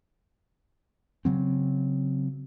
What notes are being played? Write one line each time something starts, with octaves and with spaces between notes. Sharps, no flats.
C#3 F#3 C4